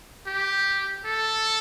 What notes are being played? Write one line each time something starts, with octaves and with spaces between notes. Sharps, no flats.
G4
A4